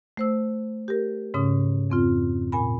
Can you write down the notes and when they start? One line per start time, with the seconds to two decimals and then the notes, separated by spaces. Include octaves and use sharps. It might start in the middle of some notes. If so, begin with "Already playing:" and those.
0.17 A3 C5 E6
0.88 G4 A#4
1.34 G#2 C#3 C#4 D#6
1.90 F2 C4 F4
2.52 A#2 G#5 B5